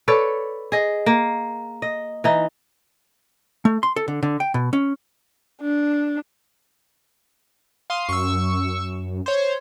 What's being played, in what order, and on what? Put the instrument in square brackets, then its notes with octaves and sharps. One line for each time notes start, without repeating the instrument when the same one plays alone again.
[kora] A4 B4 C#5 D5
G#4 D#5
A#3
D#5
E3 D#4
[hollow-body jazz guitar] A3
C6
A4
D3
D3
G5
B2
C#4
[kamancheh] D4
[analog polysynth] F5 C6 D#6
[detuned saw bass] F#2 [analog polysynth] C#6 E6
[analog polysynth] C5 C#5